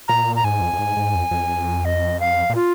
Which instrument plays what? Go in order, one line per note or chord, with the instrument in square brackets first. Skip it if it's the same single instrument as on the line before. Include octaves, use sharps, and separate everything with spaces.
[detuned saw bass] A#2 [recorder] A#5
[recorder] A#5
[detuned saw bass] G#2 [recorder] G#5
[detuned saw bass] F2
F2
G#2
G#2
F2
F2
[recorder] D#5
F5
[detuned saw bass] A#2
[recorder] F4